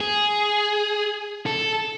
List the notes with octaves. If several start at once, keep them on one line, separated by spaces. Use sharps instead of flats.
G#4
A4